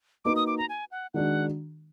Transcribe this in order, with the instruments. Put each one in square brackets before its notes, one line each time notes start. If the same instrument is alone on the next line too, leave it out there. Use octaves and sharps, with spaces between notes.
[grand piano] A#3 D#4 F#4 B4 [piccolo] D6
[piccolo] D#6
D6
A#5
G#5
F#5
[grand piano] D#3 G#3 D4 F#4 [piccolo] F#5